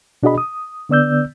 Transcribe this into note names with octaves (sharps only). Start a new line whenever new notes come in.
B2 D4 F#4 G#4 D#5 B5
D#6
D3 B3 D5 E6 G6